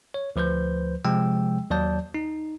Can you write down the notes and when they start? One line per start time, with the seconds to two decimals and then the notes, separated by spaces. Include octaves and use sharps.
0.14 C#5
0.36 D2 F3 B4 C5 G6
1.05 C3 F3 G#3 G5 E6
1.70 D#2 F#3 D5 A5 G6
2.14 D#4